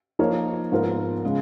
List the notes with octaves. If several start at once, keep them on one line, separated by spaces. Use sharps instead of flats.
F3 A#3 D#4 A#4 C#5
G#2 F3 B3 F4 A#4
C#3 G#3